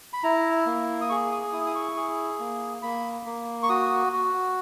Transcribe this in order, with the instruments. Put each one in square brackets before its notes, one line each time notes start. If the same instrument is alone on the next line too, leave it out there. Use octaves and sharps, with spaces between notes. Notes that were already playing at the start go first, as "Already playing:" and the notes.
[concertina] B5
E4 A#5
A#3
D#6
G#4 C#6
D#6
E4 D#6
D#6
C#6
G#4
A#3
A#3 B5
A#3
C#6
F#4 D#6
F#4